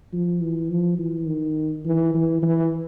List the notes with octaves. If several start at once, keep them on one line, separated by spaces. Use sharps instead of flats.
F3
E3
F3
E3
D#3
E3
E3
E3